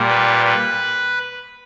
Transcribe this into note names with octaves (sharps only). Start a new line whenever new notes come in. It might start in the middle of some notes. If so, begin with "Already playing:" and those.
Already playing: A#2 G3
B4
B4